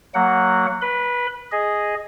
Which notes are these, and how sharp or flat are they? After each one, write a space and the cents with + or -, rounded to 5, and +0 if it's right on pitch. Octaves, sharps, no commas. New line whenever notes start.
F#3 +0 A#3 -20 F#5 +0
B4 -20 B5 +20
G#4 +0 D#5 +0